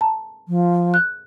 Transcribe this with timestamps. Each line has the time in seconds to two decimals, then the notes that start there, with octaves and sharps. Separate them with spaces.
0.01 A5 A#5
0.48 F3
0.94 F#6